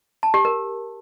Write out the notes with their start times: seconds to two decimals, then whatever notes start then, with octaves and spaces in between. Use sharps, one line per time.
0.23 A5
0.34 G4
0.45 A#4